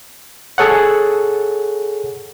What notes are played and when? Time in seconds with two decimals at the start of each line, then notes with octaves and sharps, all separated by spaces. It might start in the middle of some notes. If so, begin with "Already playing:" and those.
0.58 G#4 A4 C#5 F#5